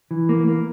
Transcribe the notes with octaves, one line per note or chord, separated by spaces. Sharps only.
E3
A#3
A#3